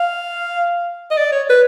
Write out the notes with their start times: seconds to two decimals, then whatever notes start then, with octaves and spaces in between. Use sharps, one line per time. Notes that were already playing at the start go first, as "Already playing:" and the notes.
Already playing: F5
1.10 D#5
1.17 D5
1.32 C#5
1.49 B4